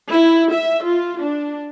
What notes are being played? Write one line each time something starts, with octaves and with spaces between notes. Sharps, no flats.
E4
E5
F4
D4